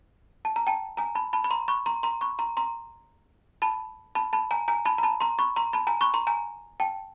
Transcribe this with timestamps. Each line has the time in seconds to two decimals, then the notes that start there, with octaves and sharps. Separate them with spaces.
0.45 A5
0.56 A#5
0.67 G5 A5
0.97 G#5 A#5
1.15 A5 B5
1.33 A5 B5
1.44 B5
1.51 A#5 C6
1.68 B5 C#6
1.86 A#5 C6
2.03 A#5 C6
2.21 B5 C#6
2.39 A#5 C6
2.57 A#5 C6
3.62 A5 B5
4.15 A5 B5
4.33 A5 B5
4.51 G#5 A#5
4.68 G#5 A#5
4.85 A5 B5
4.98 A#5
5.03 A5 B5
5.20 A#5 C6
5.39 B5 C#6
5.56 A#5 C6
5.73 A5 B5
5.87 G#5 A#5
6.01 B5 C#6
6.14 A#5 C6
6.27 G#5 A#5
6.80 G5 A5